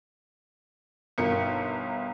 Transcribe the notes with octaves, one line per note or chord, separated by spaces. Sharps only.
G1 B2 D#3 F4 A#4 C#7